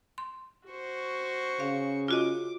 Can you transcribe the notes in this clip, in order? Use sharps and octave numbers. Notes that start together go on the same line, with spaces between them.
C6
F#4 C5 C#6
C#3 F5
F4 F#4 D#5 D6